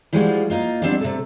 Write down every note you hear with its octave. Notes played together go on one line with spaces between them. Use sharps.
E3 F3 G3 G#3 F4 F#4
A#3 D#4 F4
G3 G#3 B3 C4 D4
C3 A3 A4